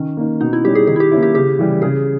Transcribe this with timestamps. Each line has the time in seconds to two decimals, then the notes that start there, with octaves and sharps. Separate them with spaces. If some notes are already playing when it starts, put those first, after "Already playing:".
Already playing: D#3 C#4
0.17 A#3 D#4
0.41 B2 D#4
0.53 E4
0.64 G3 C#4 G4
0.75 G#4
0.87 D#3 G#4
0.96 E4
1.00 G4
1.12 A#3 C#4 E4
1.23 G4
1.35 C#3 G4
1.59 E3 G3
1.82 C#3 G#4